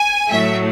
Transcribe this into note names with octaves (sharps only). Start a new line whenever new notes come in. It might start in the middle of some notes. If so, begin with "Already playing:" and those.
Already playing: G#5
A2 F#3 A3 E5